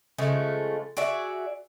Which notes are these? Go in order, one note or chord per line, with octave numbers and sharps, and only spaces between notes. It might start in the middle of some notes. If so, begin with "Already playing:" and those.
C#3 F3 G#3 A3
F#4 G#4 D5 E5